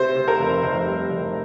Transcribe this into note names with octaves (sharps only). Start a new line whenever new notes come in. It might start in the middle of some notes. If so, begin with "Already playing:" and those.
Already playing: C3 C5
C3
A#4
F1
F1 C5
G3
F1